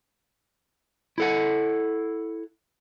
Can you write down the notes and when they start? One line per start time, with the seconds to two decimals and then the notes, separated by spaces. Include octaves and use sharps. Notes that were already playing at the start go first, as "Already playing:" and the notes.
1.18 E4 A4 F#5